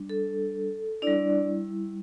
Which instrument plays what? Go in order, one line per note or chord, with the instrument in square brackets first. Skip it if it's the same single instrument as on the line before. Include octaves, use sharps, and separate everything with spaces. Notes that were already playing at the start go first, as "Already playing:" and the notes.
Already playing: [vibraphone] G3 D4
A4
G3 D4 E4 D5